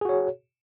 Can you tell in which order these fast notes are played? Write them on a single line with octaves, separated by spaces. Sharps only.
G#4 F#4 C#5